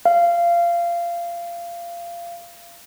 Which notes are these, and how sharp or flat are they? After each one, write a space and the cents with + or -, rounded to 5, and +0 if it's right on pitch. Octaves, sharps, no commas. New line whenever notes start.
F5 -20